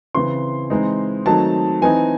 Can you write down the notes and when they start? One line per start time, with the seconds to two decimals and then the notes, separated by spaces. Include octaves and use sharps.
0.15 C#3 E3 C4 C6
0.70 E3 G#3 C4 D#4
1.26 D#3 F#3 A3 C4 D#4 A5
1.82 E3 C4 D#4 G#5